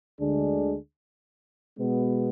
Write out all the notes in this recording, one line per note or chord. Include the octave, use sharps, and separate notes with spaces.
D2 D3 G#3 D4 G#4
B2 G#3 B3